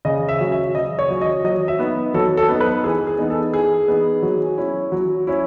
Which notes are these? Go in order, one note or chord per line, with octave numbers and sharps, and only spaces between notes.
C#3 D#5
E5
F#3 C#4
E5
C#3 D#5
C#5
F#3 C#4
D#5
F#3 D#5
E5
B3 D#4
F#3 A4
A4
B3 D#4
B4
E3 G#4
G#4
B3 D#4
A4
E3 G#4
B3 D#4
F#3
C#4 E4
F#3
C#4 E4